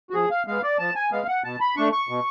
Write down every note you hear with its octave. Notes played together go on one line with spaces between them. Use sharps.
F#4
F3 G#4
F5
G#3 B3 F5
D5
F3 A5
G#5
G#3 B3 F5
F#5
B2 A5
B5
A3 D4 C#6
C#6
B2